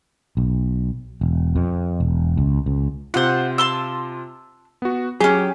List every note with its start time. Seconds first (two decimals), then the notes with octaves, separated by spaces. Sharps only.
0.37 B1
1.21 E1
1.56 F2
2.00 E1
2.37 C#2
2.66 C#2
3.14 C3 F4 C5 F#5
3.58 A5 C6 E6
4.82 B3 F#4
5.21 F#3 C#4 G4 G#4